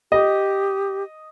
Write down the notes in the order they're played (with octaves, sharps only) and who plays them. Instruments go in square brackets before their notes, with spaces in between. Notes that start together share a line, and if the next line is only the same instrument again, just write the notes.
[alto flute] G4 [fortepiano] D#5